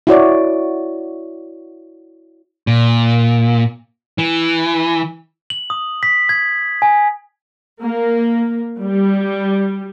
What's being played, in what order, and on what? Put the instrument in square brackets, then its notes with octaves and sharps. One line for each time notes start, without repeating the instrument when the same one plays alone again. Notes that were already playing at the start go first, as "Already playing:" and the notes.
[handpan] E4 F#4 C#5 D5
[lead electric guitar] A#2
E3
[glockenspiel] F#7
D#6
B6
G#6
G#5
[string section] A#3
G3